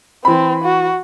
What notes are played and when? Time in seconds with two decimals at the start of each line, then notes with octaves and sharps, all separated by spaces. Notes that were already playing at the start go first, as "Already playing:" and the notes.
0.25 E3 C4 B5
0.64 F#4